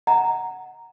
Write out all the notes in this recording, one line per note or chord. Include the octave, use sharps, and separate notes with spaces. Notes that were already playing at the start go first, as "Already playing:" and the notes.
D#5 F#5 A#5